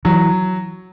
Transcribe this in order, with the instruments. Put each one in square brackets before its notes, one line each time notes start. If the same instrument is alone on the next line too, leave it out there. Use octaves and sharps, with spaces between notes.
[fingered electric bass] E3 [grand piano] F#3